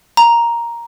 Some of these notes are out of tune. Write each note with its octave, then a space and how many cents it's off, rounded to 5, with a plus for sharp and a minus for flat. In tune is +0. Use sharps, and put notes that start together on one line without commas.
A#5 +5